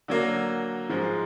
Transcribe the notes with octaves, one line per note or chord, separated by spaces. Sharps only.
D3 F#3 A#3
G#2 F3 G#3